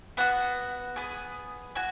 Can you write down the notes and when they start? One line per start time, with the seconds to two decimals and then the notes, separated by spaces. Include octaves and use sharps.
0.17 B3 F#4 F#5
0.96 B3 G#4
1.75 F#4 G#5